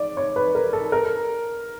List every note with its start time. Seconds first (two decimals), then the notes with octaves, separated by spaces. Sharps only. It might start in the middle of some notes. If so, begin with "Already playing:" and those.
Already playing: D5
0.17 C#5
0.36 B4
0.55 A#4
0.73 A4
0.92 A#4